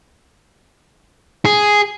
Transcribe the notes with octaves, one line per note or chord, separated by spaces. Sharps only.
G#4